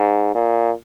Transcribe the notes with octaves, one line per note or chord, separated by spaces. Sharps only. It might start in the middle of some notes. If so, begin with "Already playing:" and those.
Already playing: G#2
A#2